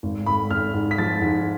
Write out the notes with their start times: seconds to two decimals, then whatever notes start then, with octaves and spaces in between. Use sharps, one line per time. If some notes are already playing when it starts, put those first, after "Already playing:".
0.03 G#1
0.26 G#1 B5
0.50 G#1 F6
0.74 G#2
0.91 B6
0.98 F3 A6
1.22 G#2